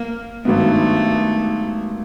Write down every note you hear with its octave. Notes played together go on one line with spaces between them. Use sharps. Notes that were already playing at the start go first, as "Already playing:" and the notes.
Already playing: A#3
G#1 G2 D#3 F#3 A3 B3